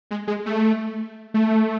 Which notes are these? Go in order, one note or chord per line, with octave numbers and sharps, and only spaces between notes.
G#3
G#3
A3
A3